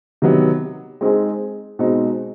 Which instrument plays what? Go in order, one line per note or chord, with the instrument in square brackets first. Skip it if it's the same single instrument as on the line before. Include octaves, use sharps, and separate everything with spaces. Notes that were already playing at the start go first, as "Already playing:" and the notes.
[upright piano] C3 D#3 F#3 B3
G#3 C4 D#4 G#4
B2 G#3 C4 D#4